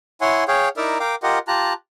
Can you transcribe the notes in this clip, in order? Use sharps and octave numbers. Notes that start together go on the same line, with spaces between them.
E4 C#5 F#5 G#5 C6
G#4 C#5 F5 G5
D#4 E4 A#4 D5 E5
A#4 F5 G5 D6
F4 G4 A#4 D#5 F#5
F4 G4 A5 A#5 F#6